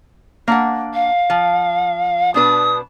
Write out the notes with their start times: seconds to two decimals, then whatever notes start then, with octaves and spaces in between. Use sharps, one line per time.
0.48 A#3 D4 F#5
0.94 F5
1.30 F3
2.34 B2 D4 B4 D#6